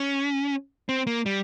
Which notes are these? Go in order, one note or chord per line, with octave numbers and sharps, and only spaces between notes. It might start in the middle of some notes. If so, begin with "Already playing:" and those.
Already playing: C#4
C4
A#3
G3